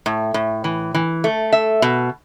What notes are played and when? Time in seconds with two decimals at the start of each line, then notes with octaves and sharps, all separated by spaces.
0.06 A2
0.34 A2
0.64 E3
0.94 E3
1.24 A3
1.53 E5
1.82 B2